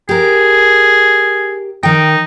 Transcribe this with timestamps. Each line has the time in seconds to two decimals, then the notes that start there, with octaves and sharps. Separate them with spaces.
0.09 G4 G#4 A#4
1.83 D#3 D#4 G5